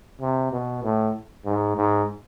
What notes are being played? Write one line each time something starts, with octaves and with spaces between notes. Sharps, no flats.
C3
B2
A2
G#2
G#2